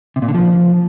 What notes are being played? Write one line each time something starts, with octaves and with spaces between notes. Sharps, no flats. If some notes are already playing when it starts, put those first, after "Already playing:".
C3
A#2
D3
F3